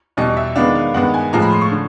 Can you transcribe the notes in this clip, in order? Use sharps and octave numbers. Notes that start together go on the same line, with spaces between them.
E2 B2 G3 D#5
E5
D#3 G#3 B3 D4 F5
F5
G2 D#3 G#3 B3 F#5
G#5
A2 F3 G#3 A#5
B5
C6
C#6
D3